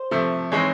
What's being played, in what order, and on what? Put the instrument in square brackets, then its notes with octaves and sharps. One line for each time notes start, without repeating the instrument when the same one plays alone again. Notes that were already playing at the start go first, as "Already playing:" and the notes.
Already playing: [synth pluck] C5
[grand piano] C3 F3 A3
[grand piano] E3 G#3 C4 D#4 [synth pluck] C#5